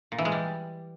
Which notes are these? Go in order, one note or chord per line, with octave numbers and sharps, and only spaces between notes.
A#2
E3
G#3
G3